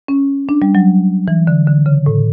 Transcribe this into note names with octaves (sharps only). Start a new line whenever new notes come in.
C#4
D4
G3
F#3
E3
D3
D3
C#3
A2